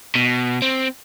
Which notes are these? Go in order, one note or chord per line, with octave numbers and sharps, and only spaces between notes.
B2
C4